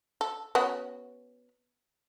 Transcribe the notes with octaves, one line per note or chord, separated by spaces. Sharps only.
A4
B3 C#4 F#4